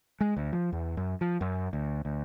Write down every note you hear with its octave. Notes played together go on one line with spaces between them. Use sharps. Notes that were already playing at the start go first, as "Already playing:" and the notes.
G#3
D2
F3
E2
F#2
F3
F#2
D2
D2